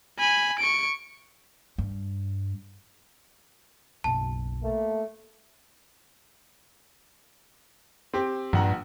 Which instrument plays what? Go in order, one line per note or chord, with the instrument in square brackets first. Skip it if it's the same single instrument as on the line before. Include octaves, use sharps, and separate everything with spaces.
[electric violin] G#5 B5
C#6 D7
[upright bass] G2
[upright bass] F#1 B1 [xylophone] A5
[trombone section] A3 A#3
[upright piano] C4 G4
[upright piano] A#1 F#5 A#5 [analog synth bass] G2